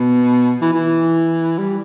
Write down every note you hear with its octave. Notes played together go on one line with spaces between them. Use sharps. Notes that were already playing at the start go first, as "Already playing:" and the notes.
Already playing: B2
E3
E3
G3